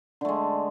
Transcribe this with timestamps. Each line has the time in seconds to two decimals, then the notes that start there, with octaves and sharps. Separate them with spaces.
0.21 D3
0.25 A3
0.29 G#3